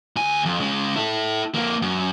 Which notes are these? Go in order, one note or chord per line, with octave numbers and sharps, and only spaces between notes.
D2 G#5
F2
C#3 G#3
E4 A4
F2 A#3
F#2